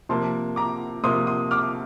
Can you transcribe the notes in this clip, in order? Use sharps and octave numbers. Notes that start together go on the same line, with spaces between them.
C3 F3 A#3 A5 C6
A#5 D6
C3 F3 A#3 C6 D#6
C6 D#6
D6 F6